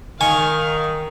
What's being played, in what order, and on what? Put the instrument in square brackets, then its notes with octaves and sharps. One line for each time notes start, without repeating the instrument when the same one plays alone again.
[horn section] D#3 [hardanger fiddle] F5 [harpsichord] G#5 C#6